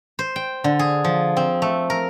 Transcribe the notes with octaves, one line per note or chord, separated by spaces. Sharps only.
C5
G5
D3
G#4
F3
C4
A3
A#4